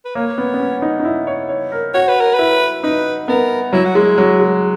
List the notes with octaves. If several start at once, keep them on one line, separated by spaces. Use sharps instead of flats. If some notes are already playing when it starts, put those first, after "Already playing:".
B4
A#3 C#5
B3
B3
C#4
D#4
D#4
E4
C#5
C#5
A#4
F#4 C#5
B4
A#4
E4 B4
D#4 B4
B3 A#4
F#3 E4
F#4
G#3 E4
F#3
G#3